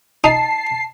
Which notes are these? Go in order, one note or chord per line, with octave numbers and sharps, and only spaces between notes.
D#4 A5 C7